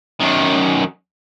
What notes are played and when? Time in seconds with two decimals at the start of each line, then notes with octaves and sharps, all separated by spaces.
0.20 F#2 D#3